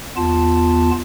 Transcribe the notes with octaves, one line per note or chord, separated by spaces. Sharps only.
E2 B3 F4 A5